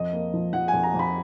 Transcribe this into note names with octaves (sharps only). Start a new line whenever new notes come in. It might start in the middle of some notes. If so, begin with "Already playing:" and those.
Already playing: F2 D#5
A#3
F3
F3 F#5
G#5
F2
A#5
F2 B5